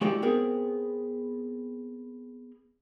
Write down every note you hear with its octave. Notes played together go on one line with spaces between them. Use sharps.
G#3 E4 F#4 G4 D5 G5
B3 C4 G#4 A#4